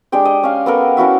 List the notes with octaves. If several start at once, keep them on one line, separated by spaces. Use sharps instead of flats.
G#3 D4 G4 G5
D#5
C#4 F5
B3 A4 A#4
C#4 E4 F#4 E5